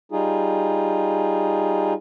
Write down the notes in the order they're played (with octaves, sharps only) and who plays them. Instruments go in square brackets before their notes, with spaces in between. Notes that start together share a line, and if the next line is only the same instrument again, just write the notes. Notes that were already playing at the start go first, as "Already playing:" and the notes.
[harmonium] G3 D#4 F4 G#4